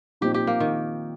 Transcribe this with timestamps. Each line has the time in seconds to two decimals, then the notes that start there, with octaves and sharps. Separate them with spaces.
0.21 A#2 F3 C4 D#4 G4
0.34 G4
0.47 A#3
0.60 D#3